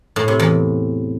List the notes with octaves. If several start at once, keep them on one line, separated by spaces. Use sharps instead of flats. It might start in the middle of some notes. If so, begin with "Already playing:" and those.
A2
C3
E2